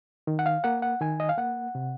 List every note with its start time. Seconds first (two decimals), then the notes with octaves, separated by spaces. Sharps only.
0.27 D#3
0.39 F#5
0.46 F5
0.64 A#3 F#5
0.82 F#5
1.00 D#3 G#5
1.20 D#5
1.29 F5
1.38 A#3 F#5
1.75 C3